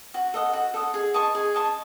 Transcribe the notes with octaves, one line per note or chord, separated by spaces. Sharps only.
F#4
A4 D#5 F#5
F#4
A4 D#5 F#5
G#4
D#5 A5 C#6
G#4
D#5 A5 C#6